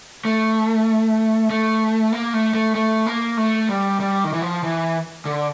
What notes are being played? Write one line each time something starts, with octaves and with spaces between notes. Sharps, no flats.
A3
A3
A#3
A3
A3
A3
A#3
A3
G3
G3
D#3
E3
F3
E3
D3